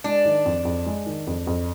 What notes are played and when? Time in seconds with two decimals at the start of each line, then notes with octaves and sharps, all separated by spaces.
0.04 G#3 D4
0.25 D#3
0.45 F2
0.65 F2
0.86 G#3
1.06 D#3
1.27 F2
1.47 F2